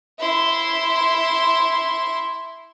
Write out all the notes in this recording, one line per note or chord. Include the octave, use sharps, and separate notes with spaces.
E4 C6